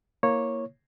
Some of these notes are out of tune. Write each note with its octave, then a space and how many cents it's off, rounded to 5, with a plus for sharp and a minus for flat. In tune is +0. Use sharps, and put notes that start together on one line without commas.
A#3 +0 E4 +0 C#5 -10